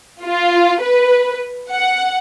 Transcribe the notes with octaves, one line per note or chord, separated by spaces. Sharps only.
F4
B4
F#5